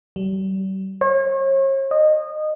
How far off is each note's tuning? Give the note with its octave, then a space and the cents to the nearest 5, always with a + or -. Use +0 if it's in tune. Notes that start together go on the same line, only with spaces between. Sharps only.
G3 -40
C#5 -40
D#5 -20